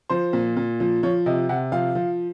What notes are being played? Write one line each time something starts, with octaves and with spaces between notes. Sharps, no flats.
F3 C5
A#2
A#2
F3
F3 C#5
C3 D#5
C3 F#5
F3 F5
F3